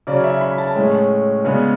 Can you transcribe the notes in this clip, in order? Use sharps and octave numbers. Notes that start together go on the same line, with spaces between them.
C#3 F#3 C#4 D5
E5
B5
A5
A2 G#3 C#4
C#3 G#3 B3 D4